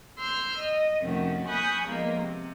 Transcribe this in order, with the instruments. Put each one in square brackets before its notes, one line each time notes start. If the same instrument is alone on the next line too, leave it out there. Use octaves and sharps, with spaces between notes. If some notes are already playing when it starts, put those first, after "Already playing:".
[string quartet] C6 E6 F6 G6
D#5
F2 C3 D#3 A3 C#4 F#4
G#5 B5 C#6 D#6 F#6 G6
A#2 F3 G#3 A#3 B3 D#4
C3